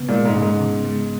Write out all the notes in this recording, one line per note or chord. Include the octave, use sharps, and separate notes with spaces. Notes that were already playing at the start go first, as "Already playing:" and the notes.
Already playing: C#3 B3
A#2 G#3
G#2
C#3
G#2
C#3
G#3